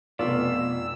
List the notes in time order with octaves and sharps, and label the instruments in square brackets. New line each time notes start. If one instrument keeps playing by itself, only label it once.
[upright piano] F1 [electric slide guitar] B2 [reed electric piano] F4 D5 [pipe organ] E6